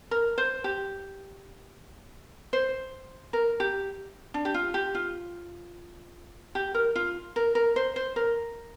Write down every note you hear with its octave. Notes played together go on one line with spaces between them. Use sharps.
A#4
C5
G4
C5
A#4
G4
D4
G4
F4
G4
F4
G4
A#4
F4
A#4
A#4
C5
C5
A#4